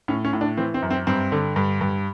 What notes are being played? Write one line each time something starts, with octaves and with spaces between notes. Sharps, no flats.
A2 C#4
C#4
A2
D4
E3 C4
C4
F#2
C4
G2 C4
D3
G2
G2